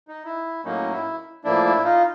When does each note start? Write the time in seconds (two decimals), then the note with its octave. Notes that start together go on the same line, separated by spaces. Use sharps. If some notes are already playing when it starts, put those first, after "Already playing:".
0.08 D#4
0.25 E4
0.65 A2 F#3 A#3 C#4 D#4
0.92 E4
1.44 A2 F3 A#3 D4 E4
1.65 E4
1.84 D#4 F4